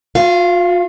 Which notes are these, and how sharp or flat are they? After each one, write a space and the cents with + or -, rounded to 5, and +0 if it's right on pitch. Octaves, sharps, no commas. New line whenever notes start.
F4 +40 F5 -20